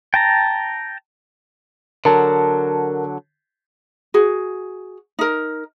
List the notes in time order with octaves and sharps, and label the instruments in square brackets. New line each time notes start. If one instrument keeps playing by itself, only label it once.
[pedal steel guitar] G5 A5 A#5
[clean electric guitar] D3 F#3 [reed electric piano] A#4 A5
[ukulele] F#4 G#4
D#4 A#4